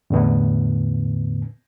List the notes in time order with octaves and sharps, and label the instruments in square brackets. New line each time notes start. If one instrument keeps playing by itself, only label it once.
[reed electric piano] E2 A2 D3 B3